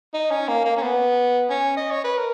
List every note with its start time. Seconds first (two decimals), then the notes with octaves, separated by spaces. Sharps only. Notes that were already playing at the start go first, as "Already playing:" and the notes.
0.14 D#4
0.31 C#4
0.48 A#3
0.65 A#3
0.77 C#4
0.82 B3
1.50 C#4
1.77 D#5
1.90 C#5
2.04 B4
2.17 A#4